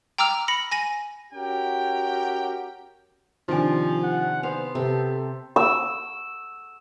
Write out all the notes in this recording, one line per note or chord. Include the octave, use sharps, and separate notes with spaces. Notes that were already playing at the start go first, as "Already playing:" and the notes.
G5 A#5 D6 E6 F6 F7
B5 A#6 C#7
G#5 A#6 D#7
C#4 F#4 G4 A#4 G5
C3 D#3 F3 D4 G#5 D6
F#5
B3 C5 F5
C3 C4 A4
E6